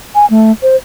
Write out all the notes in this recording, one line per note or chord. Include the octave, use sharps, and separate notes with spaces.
G#5
A3
C5